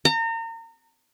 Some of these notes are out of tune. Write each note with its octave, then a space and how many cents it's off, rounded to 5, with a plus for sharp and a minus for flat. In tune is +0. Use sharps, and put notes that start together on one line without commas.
A#5 -35